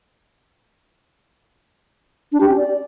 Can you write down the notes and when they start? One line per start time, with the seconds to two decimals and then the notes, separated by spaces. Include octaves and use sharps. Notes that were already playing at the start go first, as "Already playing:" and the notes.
2.32 D4
2.40 G4
2.49 C#4
2.57 D5